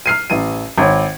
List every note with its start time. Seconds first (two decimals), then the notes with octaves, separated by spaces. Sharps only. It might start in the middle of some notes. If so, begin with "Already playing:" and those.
0.06 F6 C7 D#7
0.30 A1 D#7
0.78 G#1 C#5